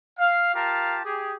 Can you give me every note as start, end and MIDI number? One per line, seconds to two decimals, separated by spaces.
0.19 0.51 77
0.54 0.99 65
0.54 0.99 67
0.54 0.99 70
0.54 0.99 77
0.54 0.99 81
1.05 1.35 67
1.05 1.35 68